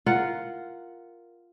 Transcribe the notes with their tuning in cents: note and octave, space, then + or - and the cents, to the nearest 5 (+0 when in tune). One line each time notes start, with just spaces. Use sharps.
F4 -5 A#4 +0 F#5 +0